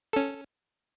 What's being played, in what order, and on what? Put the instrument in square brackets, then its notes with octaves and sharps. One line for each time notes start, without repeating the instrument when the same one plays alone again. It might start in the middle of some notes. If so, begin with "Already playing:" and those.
[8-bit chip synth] C#4 A4